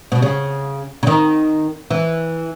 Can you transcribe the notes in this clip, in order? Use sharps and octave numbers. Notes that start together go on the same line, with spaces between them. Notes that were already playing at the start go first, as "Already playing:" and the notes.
B2
C#3
C#3
D#3
E3